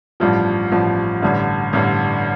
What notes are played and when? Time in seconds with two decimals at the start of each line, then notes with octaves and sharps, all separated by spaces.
0.20 A1 G2 F3
0.72 A1 G2 F3
1.22 A1 G2 D3
1.73 A1 G2 D3